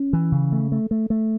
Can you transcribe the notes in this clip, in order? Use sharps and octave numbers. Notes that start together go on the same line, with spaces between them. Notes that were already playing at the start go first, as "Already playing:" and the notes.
Already playing: C#4
E3
C#3
A3
A3
A3
A3